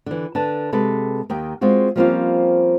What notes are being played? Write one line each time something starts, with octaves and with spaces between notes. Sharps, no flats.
D3 E3
D3 B4 A5
C3 G#3 A4 B4
D#2 D#3 G5
G#3 C4 F4 F#4
F3 G3 A#3 C4 C#4 F4